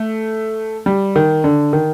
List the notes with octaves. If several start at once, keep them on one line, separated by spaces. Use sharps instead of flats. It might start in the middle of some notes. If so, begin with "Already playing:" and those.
Already playing: A3
G3
D#3
D3
D#3